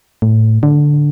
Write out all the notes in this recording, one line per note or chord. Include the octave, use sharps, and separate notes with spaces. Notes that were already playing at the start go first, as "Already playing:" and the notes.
A2
D3